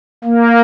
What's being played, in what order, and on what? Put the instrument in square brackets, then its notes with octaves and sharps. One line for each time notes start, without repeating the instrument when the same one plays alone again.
[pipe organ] A#3